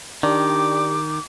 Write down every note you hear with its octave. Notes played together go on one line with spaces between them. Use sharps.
D#3 D4 G4 D6